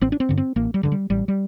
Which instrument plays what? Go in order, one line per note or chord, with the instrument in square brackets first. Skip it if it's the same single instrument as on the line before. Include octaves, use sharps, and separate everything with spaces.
[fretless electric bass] A1 C4
D4
C4
G2 D3
C4
A1 A#3
G3
G2 D3
G3
A1 G3
G3